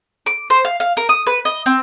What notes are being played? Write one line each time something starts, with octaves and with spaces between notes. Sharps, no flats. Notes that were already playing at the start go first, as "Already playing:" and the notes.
D6
C5
F5
F5
A#4
D#6
B4
D#5
C4